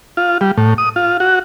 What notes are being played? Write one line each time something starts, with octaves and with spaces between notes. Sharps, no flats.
F4
G3
A2
D#6
F4
F#4